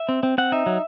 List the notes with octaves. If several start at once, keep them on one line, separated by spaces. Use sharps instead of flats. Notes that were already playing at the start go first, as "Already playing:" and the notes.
Already playing: E5
C4
C4
C4 F#5
D#4 E5
F#3